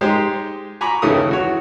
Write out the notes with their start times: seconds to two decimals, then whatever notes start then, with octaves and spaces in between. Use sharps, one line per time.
0.01 G#3 D#4 G4 C5
0.81 G#5 A#5 B5 C#6 D6
1.02 D#2 C#3 E3 E4 A4 D#6
1.29 E3 F#4 C#5